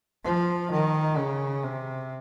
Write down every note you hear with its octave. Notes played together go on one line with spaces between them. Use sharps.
F3
D#3
C#3
C3